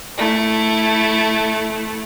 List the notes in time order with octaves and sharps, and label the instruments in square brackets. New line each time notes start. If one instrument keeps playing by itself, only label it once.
[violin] A3 E4